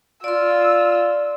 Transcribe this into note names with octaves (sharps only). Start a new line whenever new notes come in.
F4 D5 C6 E6